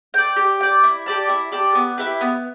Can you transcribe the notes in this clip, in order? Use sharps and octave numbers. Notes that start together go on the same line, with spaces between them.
D5 G5
G4
D5 G5
E4
G4 D5 A5
E4
G4 D5 A5
B3
E4 G4 B4
B3